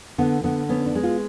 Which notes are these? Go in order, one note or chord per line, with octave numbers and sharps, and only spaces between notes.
D3 B3
D3 B3
B3 C#4
D4
G#3
F4